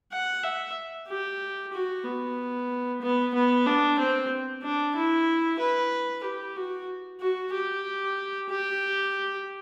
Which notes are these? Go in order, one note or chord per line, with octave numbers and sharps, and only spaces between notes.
F#5
E5
G4
F#4
B3
B3
B3
D4
C4
D4
E4
B4
G4
F#4
F#4
G4
G4